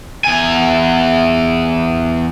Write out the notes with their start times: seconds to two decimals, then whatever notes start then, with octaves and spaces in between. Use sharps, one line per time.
0.24 E2 G#5